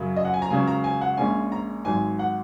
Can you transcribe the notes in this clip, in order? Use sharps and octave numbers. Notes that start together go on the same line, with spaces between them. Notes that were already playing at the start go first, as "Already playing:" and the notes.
Already playing: F#2 C#3 F#3
D#5
F#5
G#5
A#5
C#2 C#3 F#3 C#4 G#5
A#5
G#5
F#5
A#1 A#2 G#3 C#4 G#5
A#5
G#1 G#2 F#3 G#5
F#5